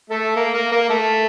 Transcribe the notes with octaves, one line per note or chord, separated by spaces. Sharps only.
A3 A4
A#3 A#4
A#3 A#4
A#3 A#4
A3 A4